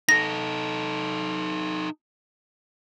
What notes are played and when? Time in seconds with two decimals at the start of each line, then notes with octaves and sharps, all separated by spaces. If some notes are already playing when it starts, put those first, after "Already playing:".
0.09 D#4 A4 A#6